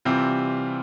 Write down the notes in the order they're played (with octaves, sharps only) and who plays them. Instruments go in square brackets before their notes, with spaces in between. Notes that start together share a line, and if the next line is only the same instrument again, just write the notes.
[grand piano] C3 E3 G3 C4 F4